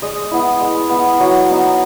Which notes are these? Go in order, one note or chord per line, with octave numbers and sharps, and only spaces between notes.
G#3 D#5
B3 E4
G#3
B3 E4
F#3
B3 D#4